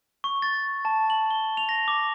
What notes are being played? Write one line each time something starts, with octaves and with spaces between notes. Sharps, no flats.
C#6
A6
A5
F#7
G7
F7
A#6
D6